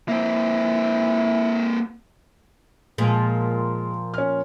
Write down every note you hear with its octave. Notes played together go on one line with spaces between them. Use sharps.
A#3 C4 E4
A#2 F3 G#3
C#4 F6